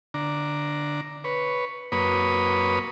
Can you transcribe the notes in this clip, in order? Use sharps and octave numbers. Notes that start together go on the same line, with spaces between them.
D3 D4 A#5
B4 C#5
F#2 A#3 B4 C#5 B5 D#6